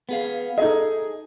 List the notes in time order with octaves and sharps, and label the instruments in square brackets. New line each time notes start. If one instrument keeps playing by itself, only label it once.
[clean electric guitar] B3 G#4 F5
[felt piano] D#4 A4 D#5 [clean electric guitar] G#4